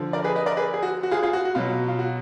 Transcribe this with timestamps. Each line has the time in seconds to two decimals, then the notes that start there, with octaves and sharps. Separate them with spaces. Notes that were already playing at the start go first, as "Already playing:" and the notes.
Already playing: D3 F3
0.13 A#4 D5
0.24 G#4 B4
0.35 B4 D#5
0.46 A#4 D5
0.57 G#4 B4
0.74 G#4
0.83 F#4
1.03 F#4
1.11 F4 G#4
1.23 F4 G#4
1.33 F#4
1.45 F#4
1.55 B2 F#3 F4
1.88 F4
1.99 F#4